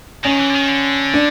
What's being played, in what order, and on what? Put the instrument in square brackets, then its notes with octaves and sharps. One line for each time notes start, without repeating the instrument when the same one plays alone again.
[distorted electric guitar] D#3 [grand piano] C#4
[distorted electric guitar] E3
D3
D#3
D3
[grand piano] D4